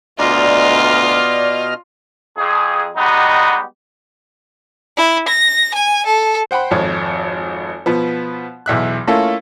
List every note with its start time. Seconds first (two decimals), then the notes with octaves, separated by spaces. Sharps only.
0.19 D2 B2 F4 D5 D#5 F6
2.38 F2 G#4
2.96 G3 G#3 B3 D#4 F#4 G4
4.97 E4
5.28 A#6
5.75 G#5
6.06 A4
6.51 C5 F#5 G5 B5 C6
6.71 G#1 F2 C#5
7.86 B2 F3 B3
8.66 B1 E2 E5 F#6
9.07 A3 A#3 C#4 E4 F4 A4